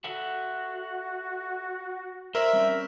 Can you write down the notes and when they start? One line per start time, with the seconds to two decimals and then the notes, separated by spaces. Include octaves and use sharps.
0.04 F#4 A4 E5 F#5
2.35 A#4 C5 D5 E5
2.53 G3 C4 C#4